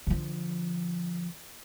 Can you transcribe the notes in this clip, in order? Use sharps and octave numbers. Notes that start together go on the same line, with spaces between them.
D3 F3